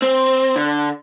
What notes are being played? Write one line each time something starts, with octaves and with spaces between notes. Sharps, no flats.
C4
D3